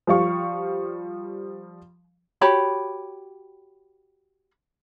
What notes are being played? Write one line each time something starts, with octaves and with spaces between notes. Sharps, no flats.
F3 G3 F5 C#6
F#4 G4 C#5 B5